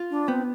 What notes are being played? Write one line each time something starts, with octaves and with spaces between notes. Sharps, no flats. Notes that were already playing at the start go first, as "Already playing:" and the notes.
Already playing: F4
D4
B3 C4